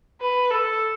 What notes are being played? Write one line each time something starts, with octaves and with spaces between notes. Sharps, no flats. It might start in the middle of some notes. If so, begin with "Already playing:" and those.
B4
A4